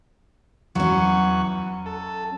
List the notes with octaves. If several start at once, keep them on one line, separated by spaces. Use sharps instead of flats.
E2 F#3 C#4 F#5 C#6
A4